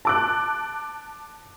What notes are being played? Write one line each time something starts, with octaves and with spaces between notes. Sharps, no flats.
A5 D6 F#6